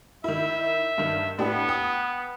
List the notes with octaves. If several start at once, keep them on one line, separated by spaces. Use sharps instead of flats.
D#3 E4 E5
G2 D#3
A2 B3 D4 G4
G5 D#6